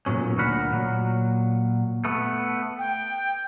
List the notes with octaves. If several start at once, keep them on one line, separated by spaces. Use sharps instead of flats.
B1 G2 A#2 F#3 C#4
D2 A#2 F#4 A#4 F#5 B5
A#2 F#3
A3 B3
G5